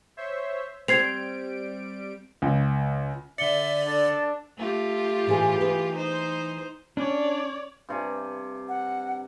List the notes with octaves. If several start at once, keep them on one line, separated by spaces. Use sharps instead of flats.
C5 C#5 E5
G3 C4 G#6 C7 D7 F7
C#2
D3 D5 E5 C#7 G7
D4 A4
A3 F4 G4
A2 E3 G#4
E3 G#4 B4
D#4 C5
C#4 D4 C#5 D5
G2 C3 G#5
F#5